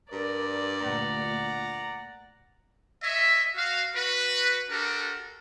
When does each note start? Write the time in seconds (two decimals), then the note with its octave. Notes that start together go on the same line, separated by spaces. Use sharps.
0.12 G2 A#4 D5
0.81 D2 A#2 F#5 A#5
3.02 C#5 D#5 E5
3.56 F#4 F5
3.94 F#4 B4
4.70 D4 F#4 G4 A4 A#4